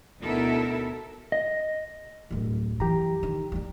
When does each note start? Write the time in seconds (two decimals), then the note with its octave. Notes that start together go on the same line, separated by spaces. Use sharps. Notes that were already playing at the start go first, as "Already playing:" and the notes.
0.21 D2 B2 D#4 E4 A4 A#4
1.32 D#5
2.31 D1 F#2
2.80 F#2 E3 G4 A#5
3.23 D#3
3.52 F#3 G3